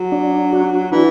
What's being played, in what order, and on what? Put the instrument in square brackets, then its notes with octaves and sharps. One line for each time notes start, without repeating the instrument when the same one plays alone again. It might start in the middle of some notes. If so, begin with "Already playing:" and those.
Already playing: [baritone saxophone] F#3
[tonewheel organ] D4
F#4
[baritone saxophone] E3 [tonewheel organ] D4